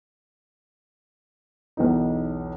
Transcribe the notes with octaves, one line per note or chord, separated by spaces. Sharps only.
B1 E2 D#4